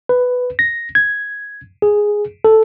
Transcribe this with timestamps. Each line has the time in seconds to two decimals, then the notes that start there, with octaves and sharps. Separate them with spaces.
0.09 B4
0.59 A#6
0.95 G#6
1.82 G#4
2.44 A4